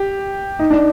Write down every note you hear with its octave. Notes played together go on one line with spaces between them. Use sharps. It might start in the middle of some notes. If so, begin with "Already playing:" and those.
Already playing: G4
D#4
D4